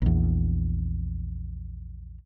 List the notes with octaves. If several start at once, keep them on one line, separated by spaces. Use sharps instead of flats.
A#1 E2